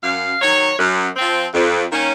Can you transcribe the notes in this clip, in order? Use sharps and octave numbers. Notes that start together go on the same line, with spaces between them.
F#2 F5
D#3 F#3 C#5
F#2
F3 C4
F2
D#3 A#3 C#4